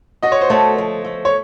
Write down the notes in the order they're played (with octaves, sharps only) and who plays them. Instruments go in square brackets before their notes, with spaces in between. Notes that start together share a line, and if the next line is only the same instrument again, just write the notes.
[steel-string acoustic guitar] F#4 [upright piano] D#5
[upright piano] C#5
C5
[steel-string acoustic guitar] A3 [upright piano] C#5
[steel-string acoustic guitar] F3
A3
[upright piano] C#5